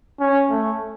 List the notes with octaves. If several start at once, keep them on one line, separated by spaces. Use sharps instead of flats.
C#4
A3